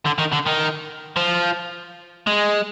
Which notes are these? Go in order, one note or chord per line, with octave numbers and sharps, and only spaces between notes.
D3
D#3
D3
D#3
F3
G#3